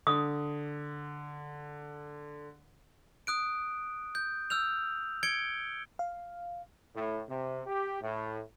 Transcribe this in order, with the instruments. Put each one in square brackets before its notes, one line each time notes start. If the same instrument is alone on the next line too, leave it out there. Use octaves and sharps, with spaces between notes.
[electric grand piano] D3 [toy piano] D#6
[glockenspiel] D#6 F#6 D7
G6
E6 F6 G6 F7
G#6 C#7 D7 G7
[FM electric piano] F5
[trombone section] A2
C3
G4
A2